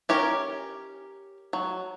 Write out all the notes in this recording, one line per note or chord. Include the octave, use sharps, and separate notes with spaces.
C#4 G4 A#4 C#5
F#3